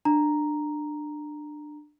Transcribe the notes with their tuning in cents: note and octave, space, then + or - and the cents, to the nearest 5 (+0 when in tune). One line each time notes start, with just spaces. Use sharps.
D4 +20 A#5 +0